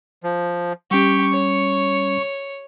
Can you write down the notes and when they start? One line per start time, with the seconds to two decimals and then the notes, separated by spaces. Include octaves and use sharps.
0.24 F3
0.91 G3 C#4 G4 C#6
1.33 C#5